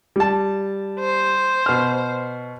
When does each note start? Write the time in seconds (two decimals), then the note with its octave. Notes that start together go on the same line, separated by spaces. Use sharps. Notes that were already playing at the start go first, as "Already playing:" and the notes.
0.16 G3 A5
0.99 C5
1.66 B2 F6